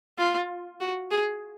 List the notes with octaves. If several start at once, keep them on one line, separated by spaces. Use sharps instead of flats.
F4
F#4
G#4